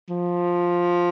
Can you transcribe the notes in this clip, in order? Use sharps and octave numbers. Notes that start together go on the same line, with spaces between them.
F3